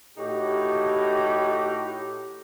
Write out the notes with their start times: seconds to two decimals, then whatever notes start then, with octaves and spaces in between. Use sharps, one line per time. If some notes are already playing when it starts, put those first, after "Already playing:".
0.18 A2 D#4 F#4 G4